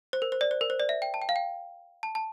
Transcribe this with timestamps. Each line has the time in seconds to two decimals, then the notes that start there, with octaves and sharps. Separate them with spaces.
0.13 C5
0.22 A#4
0.32 C5
0.41 D5
0.51 C5
0.61 A#4
0.70 C5
0.80 D5
0.89 E5
1.02 G5
1.14 A5
1.22 G5
1.29 F5
1.36 G5
2.03 A5
2.15 A5